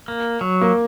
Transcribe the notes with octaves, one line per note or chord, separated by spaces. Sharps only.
A#3
F#3
A#3